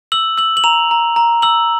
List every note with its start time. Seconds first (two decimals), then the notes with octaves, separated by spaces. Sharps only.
0.12 E6 F#7
0.38 E6 F#7
0.57 F#7
0.64 A#5 F7
0.91 A#5
1.16 A#5
1.42 E6 F#7